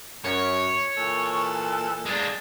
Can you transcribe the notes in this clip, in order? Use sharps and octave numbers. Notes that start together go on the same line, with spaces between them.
F#2 C#5
A#2 E3 A4
G#3 D4